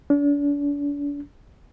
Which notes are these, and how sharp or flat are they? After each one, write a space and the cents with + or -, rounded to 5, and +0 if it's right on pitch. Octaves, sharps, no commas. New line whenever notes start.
D4 -40